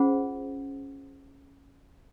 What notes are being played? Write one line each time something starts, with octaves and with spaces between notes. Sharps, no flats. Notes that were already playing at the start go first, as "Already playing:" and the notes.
Already playing: C#4 F4 G#4 C5 F#5